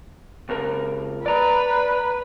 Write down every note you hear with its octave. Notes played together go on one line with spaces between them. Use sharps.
C#2 A#4
B4 D5 A#5